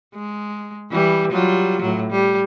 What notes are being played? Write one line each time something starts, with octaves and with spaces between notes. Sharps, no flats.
G#3
E3 G3
F#3 G3 F4
A2 F#3
G3